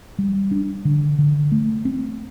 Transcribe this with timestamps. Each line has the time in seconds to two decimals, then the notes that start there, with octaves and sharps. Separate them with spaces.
0.19 G3
0.51 D4
0.85 D3
1.19 D3
1.52 A3
1.85 C4